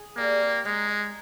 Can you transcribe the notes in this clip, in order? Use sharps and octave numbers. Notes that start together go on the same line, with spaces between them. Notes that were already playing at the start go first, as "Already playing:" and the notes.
Already playing: G#4
G3 A#3
C4
G#3 D#4
D#4